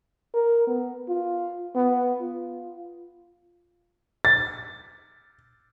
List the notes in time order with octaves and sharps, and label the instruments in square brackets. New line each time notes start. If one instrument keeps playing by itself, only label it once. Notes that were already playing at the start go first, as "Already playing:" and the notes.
[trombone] A#4
B3
F4
B3
F4
[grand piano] A6